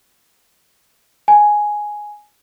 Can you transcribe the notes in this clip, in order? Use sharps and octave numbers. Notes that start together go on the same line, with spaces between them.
G#5